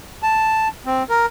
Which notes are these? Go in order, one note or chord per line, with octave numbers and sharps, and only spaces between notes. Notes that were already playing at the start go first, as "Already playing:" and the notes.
A5
C4
A#4